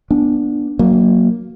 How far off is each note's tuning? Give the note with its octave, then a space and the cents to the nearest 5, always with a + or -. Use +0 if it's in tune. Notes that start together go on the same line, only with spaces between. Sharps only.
B3 -25 D4 +5
F#3 +0 A#3 +0